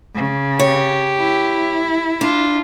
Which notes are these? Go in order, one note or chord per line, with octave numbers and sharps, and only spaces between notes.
C#3
G4 C#5
E4
D4 F4